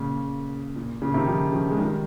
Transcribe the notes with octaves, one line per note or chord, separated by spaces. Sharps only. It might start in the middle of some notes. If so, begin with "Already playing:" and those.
Already playing: A#2 C#3
A#2
A#2 C#3
C3 D#3
C#3 F3
C#3 F3
G#3
D#3 G3